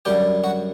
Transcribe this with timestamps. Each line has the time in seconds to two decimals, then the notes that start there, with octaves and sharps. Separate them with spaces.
0.05 F#2 D3 G3 G4 G5
0.44 F#4 F#5